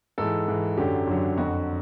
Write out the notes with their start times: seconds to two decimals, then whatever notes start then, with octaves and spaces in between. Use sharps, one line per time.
0.18 G#2 E3 A4
0.48 G#2 E3
0.78 F#2 D3 F#3 G4
1.07 F#2 D3 F#3
1.38 F2 D3 F#3 F#4